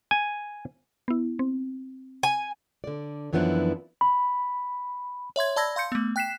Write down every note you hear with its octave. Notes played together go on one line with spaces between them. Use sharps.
G#5
B3 E4
C4
G#5
D3 D5
F#2 E3 F3 B3 D4 E4
B5
C#5 E5 C6 G#6
D5 A5 B5 E6 G#6 A#6
F5 C6 G6 C#7
A3 B3
G5 F#6 B6 C7 E7